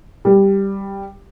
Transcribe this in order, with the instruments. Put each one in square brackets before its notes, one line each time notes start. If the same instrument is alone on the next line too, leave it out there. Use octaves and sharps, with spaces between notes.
[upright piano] G3